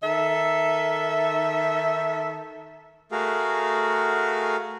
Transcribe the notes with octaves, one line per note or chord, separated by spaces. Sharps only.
D#3 A4 E5
A3 F#4 G#4 A#4 F5